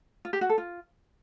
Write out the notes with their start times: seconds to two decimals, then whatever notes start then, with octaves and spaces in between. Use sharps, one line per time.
0.25 F4
0.33 G4
0.41 F#4
0.49 A4
0.58 F4